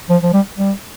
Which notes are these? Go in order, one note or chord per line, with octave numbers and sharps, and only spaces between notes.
F3
F3
G3
G3